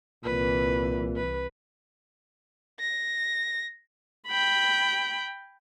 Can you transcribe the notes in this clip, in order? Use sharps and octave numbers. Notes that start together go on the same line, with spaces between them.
C2 A#2 E3 B4
B4
A#6
G5 B5